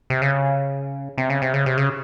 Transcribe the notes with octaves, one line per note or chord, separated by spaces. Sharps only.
C3
C#3
C3
C#3
C3
C#3
C3
C#3